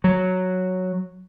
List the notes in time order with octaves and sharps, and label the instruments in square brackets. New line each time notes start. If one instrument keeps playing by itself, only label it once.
[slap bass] F#3